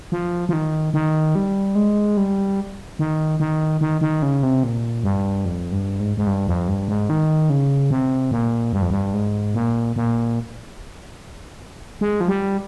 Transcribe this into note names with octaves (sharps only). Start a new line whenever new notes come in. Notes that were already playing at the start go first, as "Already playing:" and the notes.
F3
F3
D#3
D#3
G3
G#3
G3
D#3
D#3
D#3
D#3
C#3
C3
A#2
G2
F2
G2
G#2
G#2
G2
F2
G2
G#2
D#3
C#3
C3
A#2
G2
F2
G2
G#2
A#2
A#2
G#3
F3
G3